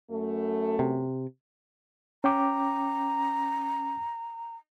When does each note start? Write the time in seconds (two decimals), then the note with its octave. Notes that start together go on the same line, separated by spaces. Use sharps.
0.10 F#2 A3
0.79 C3
2.24 C#4 G5 A#5 D6